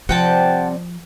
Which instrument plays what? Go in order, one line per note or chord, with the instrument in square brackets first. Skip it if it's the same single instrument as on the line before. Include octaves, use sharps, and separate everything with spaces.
[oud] C3 G3 [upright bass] F3 [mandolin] F#5 G5 A5